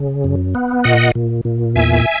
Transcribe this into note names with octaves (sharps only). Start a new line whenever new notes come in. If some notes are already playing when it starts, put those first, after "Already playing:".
Already playing: C#3
F#2
B3
A#2 D#5 F#5
A#2
A#2
E2 E5 G#5